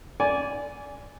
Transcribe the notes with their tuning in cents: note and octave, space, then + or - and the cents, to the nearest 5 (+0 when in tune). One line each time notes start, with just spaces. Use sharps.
D5 -20 G#5 +0